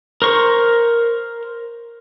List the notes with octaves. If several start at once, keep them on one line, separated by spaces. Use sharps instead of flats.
A#4 C5 C#6